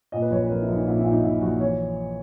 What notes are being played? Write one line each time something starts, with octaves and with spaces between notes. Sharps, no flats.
A#2 D#5
B4
A#1 C#5
B4
A#1 A#4
E4
A#1
D#4
A#2 E4
E4
A#2
D#4
A#2 E4
A#1 F#4
E3 C#5